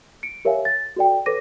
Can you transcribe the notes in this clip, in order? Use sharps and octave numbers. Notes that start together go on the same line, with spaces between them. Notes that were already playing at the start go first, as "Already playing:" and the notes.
C#7 D7
G4 A#4 C#5 E5 F5 G#5
A6
F#4 A4 D5 G5
A4 B4 C#5 D6 A#6 D#7